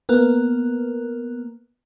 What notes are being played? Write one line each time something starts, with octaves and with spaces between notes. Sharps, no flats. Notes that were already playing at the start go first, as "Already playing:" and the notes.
A#3 B3 A#4